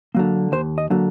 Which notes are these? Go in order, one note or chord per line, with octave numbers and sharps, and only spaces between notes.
D3 F#3 A#3
D#2 C5
D#5
D3 F#3 A#3